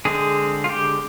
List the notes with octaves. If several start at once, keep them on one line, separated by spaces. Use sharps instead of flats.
D3 G#3 C4 G#4
F4
G4